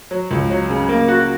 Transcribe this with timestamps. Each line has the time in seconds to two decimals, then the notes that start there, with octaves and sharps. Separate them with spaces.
0.11 F#3
0.31 C#2
0.50 F#3
0.70 C#3
0.89 A#3
1.08 F#4